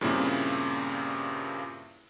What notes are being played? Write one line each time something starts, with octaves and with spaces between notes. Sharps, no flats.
G2 A#2 C#3 A#3 C4 E4